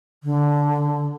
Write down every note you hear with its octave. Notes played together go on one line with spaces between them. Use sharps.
D3